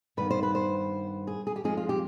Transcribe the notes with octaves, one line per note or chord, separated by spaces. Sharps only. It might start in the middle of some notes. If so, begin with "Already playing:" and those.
G2 D#3 B3 B4
C5
B4
C5
G#4
G#4
G4
G2 F3 G#3 C4 G#4
F4
G4